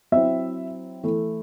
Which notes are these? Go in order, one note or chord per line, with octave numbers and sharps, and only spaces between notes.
F#3 C4 E4 E5
E3 A3 E4